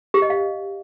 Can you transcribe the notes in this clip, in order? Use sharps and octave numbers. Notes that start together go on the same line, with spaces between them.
G4
D#5
F5